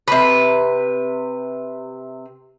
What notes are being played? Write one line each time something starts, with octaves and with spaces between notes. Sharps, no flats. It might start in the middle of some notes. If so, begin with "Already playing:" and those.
C3 B4